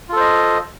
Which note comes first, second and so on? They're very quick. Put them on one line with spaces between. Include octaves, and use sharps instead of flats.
F4 A4 C5 D#5